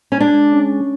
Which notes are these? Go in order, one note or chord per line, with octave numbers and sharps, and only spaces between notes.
C#4
G#3 D4
C#4